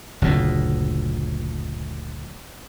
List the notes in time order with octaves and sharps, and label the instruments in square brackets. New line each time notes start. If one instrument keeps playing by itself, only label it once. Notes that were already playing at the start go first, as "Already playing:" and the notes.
[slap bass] F#1 D2 A#2